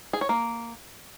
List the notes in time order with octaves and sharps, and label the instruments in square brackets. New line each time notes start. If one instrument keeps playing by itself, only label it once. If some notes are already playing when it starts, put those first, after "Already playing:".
[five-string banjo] G#4
C#5
A#3